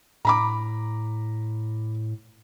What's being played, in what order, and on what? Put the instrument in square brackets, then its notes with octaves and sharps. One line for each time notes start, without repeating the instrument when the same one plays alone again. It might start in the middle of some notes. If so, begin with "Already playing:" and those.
[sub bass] A2 [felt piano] A#5 B5 D6